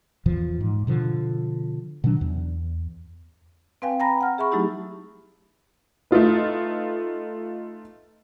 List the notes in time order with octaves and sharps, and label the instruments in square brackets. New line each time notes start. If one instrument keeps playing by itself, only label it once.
[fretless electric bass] E2 A#2 E3 F3
G#2
B2 D3 F3
B2 D#3 F#3 D4
E2
[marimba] C4 B4 F5 G5 G#5
G5 G#5 A#5 B5 A#6
F#5 F6
G#4 E5 B5 C#6
F#3 A3 D#4 E4 G4
[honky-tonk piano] A3 D#4 F4 B4